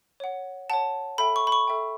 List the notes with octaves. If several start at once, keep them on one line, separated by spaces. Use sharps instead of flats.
C#5 F#5
C#5 F#5 A5
A4 E5 G5 B5
C#6
B5
C#6
A4 E5 G5